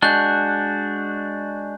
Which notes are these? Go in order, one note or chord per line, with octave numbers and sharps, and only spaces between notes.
G#3 D4 F#4 F#6 G6